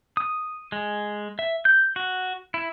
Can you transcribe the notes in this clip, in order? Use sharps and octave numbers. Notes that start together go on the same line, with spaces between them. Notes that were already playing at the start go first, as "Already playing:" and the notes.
D#6
G#3
E5
G6
F#4
E4